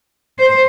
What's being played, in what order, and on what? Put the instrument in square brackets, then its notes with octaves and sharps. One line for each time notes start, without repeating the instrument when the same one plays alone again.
[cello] C5